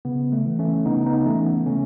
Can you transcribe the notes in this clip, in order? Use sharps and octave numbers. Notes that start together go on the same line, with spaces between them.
C#3 B3
A3
E3
A3 C#4
C#3 B3 D#4
B3 D#4
E3 A3 C#4
B3
C#3 A3 C#4